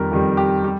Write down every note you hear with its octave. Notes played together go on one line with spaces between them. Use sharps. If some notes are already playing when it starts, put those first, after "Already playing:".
Already playing: F2 D#3 G3 A#4
F2 D#3 G3
G4
G3